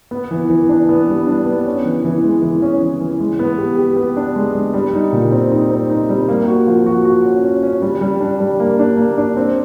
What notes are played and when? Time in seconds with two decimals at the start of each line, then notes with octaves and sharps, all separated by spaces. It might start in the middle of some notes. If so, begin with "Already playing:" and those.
0.11 B3
0.31 E3
0.50 E3
0.69 D4
0.89 B3
1.08 G3
1.27 D4
1.46 B3
1.66 C#4
1.85 E3
2.04 E3
2.24 G#3
2.42 E3
2.62 C#4
2.82 E3
3.00 E3
3.21 G#3
3.39 B3
3.58 G4
3.78 G4
3.96 B3
4.17 D4
4.36 G#3
4.55 G#3
4.74 G3
4.94 D#4
5.13 A#2
5.32 C4
5.52 D#4
5.71 C4
5.90 D#4
6.09 G3
6.28 A#3
6.48 F#4
6.67 F3
6.86 F#4
7.05 F#4
7.25 C#4
7.44 C#4
7.63 C#4
7.82 G3
8.01 G3
8.21 D4
8.40 G3
8.60 A#3
8.79 D4
8.98 A#3
9.18 D4
9.37 C4